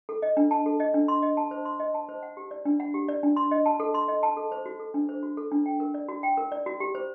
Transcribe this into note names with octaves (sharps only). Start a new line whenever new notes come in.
A4
D#5
D4
A5
A4
D#5
D4
C6
D#5
A5
C5
C6
D#5
A5
C5
F#5
G4
D5
D4
F#5
G4
D5
D4
C6
D#5
A5
A4
C6
D#5
A5
A4
C5
F#4
A4
D4
C5
F#4
A4
D4
G5
A#4
D5
F#4
G5
A#4
D5
F#4
G4
C5